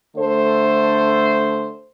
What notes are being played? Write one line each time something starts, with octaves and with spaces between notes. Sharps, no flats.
D3 A3 A4 C5